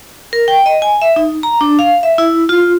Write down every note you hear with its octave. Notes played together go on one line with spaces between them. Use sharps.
A#4
G5
D#5
G#5
E5
D#4
A#5
D4
F5
E5
E4
F4